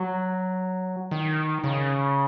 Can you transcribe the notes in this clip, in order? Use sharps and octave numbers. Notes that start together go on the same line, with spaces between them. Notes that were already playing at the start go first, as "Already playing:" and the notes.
Already playing: F#3
D#3
C#3